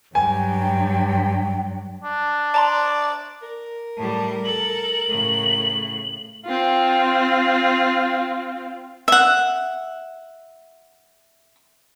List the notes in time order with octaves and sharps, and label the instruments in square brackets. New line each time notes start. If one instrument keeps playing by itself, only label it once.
[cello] G2 F#3 [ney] G5 [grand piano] G#5
[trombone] D4
[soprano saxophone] D5 [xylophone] A5 A#5 C6
[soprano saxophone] A#4
[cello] A2 G3 [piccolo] A5
[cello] A4 [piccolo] F#7
[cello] A2 C#3
[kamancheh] C4 F4
[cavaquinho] E5 F#5